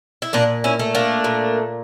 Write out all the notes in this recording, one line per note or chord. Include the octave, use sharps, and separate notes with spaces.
E4
A#2 A#3 D4
C#4 E4
A3
A#3 D4
A#2